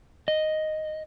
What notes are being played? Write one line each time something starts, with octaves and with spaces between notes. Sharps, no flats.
D#5